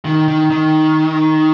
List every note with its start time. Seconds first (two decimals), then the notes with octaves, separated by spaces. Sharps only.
0.05 D#3
0.28 D#3
0.50 D#3